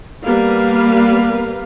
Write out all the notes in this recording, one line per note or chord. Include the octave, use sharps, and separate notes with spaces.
G3 A#3 B3 A#4 B4 F5